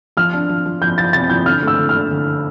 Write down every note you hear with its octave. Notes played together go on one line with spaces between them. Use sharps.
F3 F6
D4
F3
F3
F3 G6
F3 A6
C3 A6
F3 G6
D3 F6
A3
E6
D3
F6
D3
D3